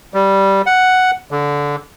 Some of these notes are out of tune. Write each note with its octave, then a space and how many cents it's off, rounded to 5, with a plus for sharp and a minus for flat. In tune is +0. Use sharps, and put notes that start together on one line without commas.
G3 -5
F#5 +0
D3 -15